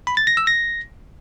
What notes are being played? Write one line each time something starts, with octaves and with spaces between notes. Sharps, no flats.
B5
A6
A#6
E6
A#6